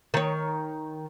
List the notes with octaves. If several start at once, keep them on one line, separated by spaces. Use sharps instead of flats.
D#3 C#5